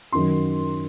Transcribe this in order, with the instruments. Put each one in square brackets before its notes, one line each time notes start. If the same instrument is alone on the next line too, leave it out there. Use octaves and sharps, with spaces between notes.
[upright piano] F#2 D#3 F#3 C6